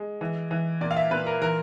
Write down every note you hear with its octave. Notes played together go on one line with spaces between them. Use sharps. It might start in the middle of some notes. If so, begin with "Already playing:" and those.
Already playing: G#3
E3
E3
A#2 D5
F5
E5
A#2 B4
A#4
E3 A#4